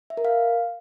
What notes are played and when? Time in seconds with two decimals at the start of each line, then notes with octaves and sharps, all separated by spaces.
0.10 E5
0.17 A#4
0.25 F5